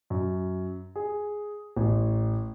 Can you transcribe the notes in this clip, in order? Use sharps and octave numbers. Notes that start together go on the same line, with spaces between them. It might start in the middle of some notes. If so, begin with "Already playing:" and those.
F#2
G#4
A1